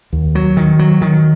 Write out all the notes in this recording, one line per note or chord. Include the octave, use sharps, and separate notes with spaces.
D#2
F#3
D#3
F#3
D#3